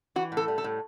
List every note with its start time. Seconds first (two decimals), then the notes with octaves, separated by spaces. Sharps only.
0.16 E3 F#4
0.32 A2
0.37 A4
0.48 G3
0.58 A4
0.64 A2